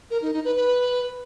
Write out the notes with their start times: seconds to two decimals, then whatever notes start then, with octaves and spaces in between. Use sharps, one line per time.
0.10 A#4
0.22 D#4
0.33 D#4
0.45 B4
0.56 B4